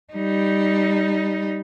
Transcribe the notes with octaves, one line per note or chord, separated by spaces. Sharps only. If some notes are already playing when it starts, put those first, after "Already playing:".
G3 D#4